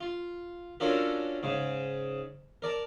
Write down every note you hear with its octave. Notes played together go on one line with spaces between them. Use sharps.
F4
C#4 D4 F4 F#4 A4 A#4
G#2 C#3
A#4 D5 A5